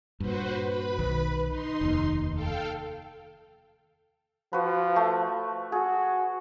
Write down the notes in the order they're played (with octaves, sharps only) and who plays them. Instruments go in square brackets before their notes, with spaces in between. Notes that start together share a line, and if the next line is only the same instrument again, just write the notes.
[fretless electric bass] G2 A#2 [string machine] F#4 B4 C5
[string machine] B4 B5
[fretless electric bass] B1 D#3
[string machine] D#4 C6
[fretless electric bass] F1 D#2
[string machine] A4 F5 G5
[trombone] F3 [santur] F#4 B4
[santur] A3
[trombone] F#4 [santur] G#4